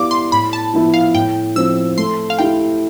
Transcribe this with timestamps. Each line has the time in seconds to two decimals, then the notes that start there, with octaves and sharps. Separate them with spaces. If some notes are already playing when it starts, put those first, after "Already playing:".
Already playing: B3 E4 G4 D5 F5 D6
0.11 C6
0.32 A2 B5
0.53 A5
0.74 F3 B3 E4
0.94 F5
1.14 A2 G5
1.56 F3 C4 E6
1.97 A3 C6
2.30 F5
2.39 E4 G4 G5